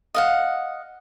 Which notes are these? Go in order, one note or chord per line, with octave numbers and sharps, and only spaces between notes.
D#5 F5 F#5